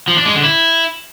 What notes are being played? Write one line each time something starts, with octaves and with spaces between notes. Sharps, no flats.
F3
D4
G#3
D3
E4